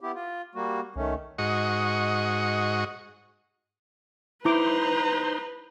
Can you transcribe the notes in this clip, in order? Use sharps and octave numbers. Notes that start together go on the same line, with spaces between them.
B3 E4 G4
F4
G3 A#3 F#4
C2 D#3 A3 C#4
G#2 F#4 D#5 C#6
D#4 E4 B4 C5 A#5 C6 D6